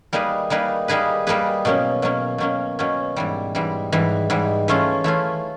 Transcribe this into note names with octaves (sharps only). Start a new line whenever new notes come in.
G3 A#3 D#4 G#4 B4
G3 A#3 D#4 G#4 B4
G3 A#3 D#4 G#4 B4
G3 A#3 D#4 G#4 B4
B2 F#3 A#3 C#4
B2 F#3 A#3 C#4
B2 F#3 A#3 C#4
B2 F#3 A#3 C#4
G#2 E3 G3
G#2 E3 G3
G#2 E3 G3
G#2 E3 G3
E3 A3 C#4 F4
E3 A3 C#4 F4